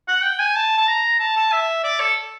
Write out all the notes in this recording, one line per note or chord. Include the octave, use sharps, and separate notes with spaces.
F#5
G5
G#5
A5
A5
A#5
A5
A5
E5
D5
A4